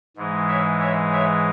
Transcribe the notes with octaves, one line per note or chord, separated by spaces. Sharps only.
G#2 E3 G#3
C#5 E5
C#5 E5
C#5 E5